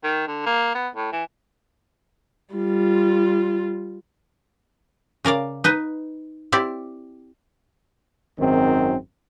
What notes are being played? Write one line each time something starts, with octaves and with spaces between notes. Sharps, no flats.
D#3
D3
A#3
B3
A2
E3
G3 F4
C#3 A#4 D5 F5
D#4 B4 D#5
C4 E4 G4 D5
G#1 F#2 D#3 C4